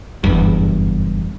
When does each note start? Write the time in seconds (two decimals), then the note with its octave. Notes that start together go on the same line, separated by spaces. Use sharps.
0.24 F#1 E2 G2